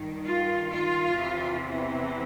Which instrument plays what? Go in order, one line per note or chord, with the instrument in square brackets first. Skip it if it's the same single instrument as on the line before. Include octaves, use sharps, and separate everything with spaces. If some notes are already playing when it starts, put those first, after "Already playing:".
Already playing: [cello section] G2 D#3
F4
F4
E2 C3 E3